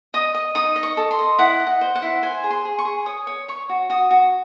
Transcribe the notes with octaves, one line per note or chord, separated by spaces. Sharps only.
D#5 D#6
D#5
D#4 D#6
D#5
C#6
A4
C6
D#5
E4 F#5
D#5
F#5
C5
F#5
E4
C5 G#5
G#4
C6
G#4
C#6
G#4
C#5 D#6
C#5
C#5 C#6
F#4
F#4 D#6
F#4